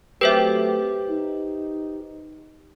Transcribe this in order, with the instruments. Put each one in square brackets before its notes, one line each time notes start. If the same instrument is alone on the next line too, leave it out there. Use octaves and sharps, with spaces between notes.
[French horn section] F#3 A3 C4 [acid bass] G4 [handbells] B4 C5 E5
[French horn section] D#4